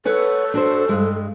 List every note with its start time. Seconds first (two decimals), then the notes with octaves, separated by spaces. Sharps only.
0.05 A4 B4 C#5 F#5
0.54 D4 F#4 C5
0.89 G2 G#3